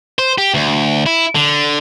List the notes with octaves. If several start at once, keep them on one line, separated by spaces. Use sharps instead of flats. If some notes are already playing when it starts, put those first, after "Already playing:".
C5
G4
D2
E4
D3